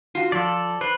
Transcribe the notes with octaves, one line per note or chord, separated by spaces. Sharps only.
F4 F#4
F3 A4 D5
B4 C5